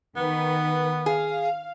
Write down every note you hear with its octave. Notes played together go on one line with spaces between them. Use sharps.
D#3 B3 B4
G#4 F5